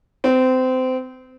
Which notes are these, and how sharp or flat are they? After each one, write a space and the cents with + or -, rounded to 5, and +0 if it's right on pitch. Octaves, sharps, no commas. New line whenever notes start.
C4 -25